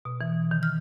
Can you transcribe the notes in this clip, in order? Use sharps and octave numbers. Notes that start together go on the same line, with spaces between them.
B2
E3
D#3
F6